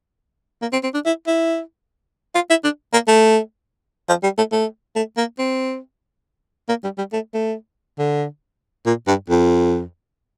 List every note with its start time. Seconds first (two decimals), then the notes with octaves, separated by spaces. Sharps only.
0.62 A#3
0.73 C4
0.83 C4
0.94 D4
1.06 E4
1.27 E4
2.35 F4
2.50 E4
2.64 D4
2.93 A#3
3.07 A3
4.09 F3
4.23 G3
4.38 A3
4.52 A3
4.96 A3
5.17 A#3
5.39 C4
6.69 A#3
6.84 G3
6.98 G3
7.12 A3
7.34 A3
7.99 D3
8.86 A#2
9.07 G2
9.30 F2